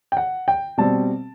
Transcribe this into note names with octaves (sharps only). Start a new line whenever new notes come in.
G5
F#5
G5
B2 G3 C4 A5